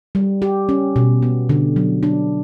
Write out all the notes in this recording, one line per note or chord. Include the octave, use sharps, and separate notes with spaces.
G3
G4
C#4
B2
B3
D3
F#3
D4